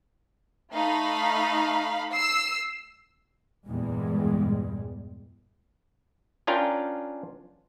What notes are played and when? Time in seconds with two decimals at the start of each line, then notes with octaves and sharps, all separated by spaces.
0.73 A3 D#4 F5 B5
2.11 E6 C7
3.66 E2 G2 A#2 G3 G#3
6.47 C#4 D4 F4 A#4 F5 G5